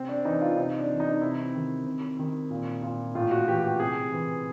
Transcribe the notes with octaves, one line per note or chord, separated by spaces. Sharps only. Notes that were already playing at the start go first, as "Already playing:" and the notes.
Already playing: C3 C4
D4
E3 D#4
F4
C3 D#4
D4
E3
D#4
C3 E4
D#3
C3
D#3
A#2
A#2
A2 F4
F#4
E3 G4
G4
C3 G#4
E3